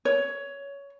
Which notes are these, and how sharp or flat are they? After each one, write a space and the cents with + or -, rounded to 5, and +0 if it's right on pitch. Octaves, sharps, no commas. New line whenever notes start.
C#5 +15